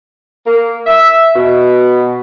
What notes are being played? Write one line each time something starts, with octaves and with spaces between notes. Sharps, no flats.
A#3
E5
B2